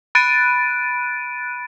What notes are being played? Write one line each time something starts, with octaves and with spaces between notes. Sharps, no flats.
B5 F#6 A6 D7 D#7